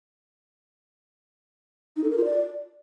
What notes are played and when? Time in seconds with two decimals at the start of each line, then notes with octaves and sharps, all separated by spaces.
1.97 D#4
2.04 A4
2.11 A#4
2.17 F4
2.24 D5